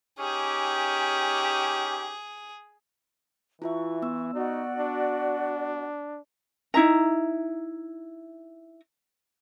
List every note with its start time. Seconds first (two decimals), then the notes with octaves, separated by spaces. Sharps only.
0.19 C#4 D#4 G4 G#4
3.62 E3 E4 F4 E5 C#6
4.02 B3 E6
4.34 D#4 F#4 D5
4.79 D4
6.74 D#4 E4 E5 A#5